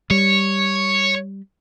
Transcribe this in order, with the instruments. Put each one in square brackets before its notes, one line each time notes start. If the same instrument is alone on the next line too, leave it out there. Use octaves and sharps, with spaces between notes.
[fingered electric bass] G3 [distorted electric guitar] C#5